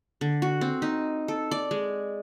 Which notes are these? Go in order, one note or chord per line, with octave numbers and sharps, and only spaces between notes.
D3
F#4
C4
D#4
A4
D5
G#3